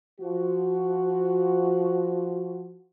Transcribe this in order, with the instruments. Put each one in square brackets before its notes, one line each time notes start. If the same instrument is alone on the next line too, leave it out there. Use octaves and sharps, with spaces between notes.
[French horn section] F3 F#4